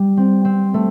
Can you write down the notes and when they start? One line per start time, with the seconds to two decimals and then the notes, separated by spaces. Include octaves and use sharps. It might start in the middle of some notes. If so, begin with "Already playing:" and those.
Already playing: G3
0.17 C4
0.45 C4
0.74 A3